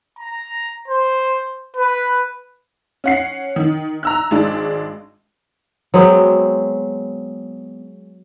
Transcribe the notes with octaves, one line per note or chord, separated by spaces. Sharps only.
A#5
C5
B4
C#4 F#5 C7
D#3
A#5 E6 F#6
G#1 G#3 D4
F#3 G#3 B3 C4